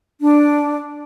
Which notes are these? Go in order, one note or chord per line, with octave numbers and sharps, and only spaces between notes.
D4